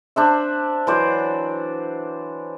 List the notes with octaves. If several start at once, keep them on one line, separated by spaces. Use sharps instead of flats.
D4 C5 E5
E3 F#3 C5 D5